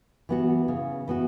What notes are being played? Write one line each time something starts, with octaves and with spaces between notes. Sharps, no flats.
E3 B3 F#4
C#3
E3 B3 F#4